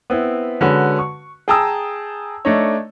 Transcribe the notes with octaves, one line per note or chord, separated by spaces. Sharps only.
B3 C4 E4
D3 G#3 C#4 F#4 B4
C#6
G#4 G5 A5 A#5 D#6 E6
A3 D4 D#4 C#5